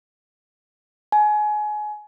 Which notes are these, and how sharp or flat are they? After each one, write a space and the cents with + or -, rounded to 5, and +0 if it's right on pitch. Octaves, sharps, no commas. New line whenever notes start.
G#5 +25